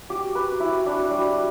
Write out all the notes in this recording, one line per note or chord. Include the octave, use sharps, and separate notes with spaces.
F#4 G4
B4
E4
D4
G3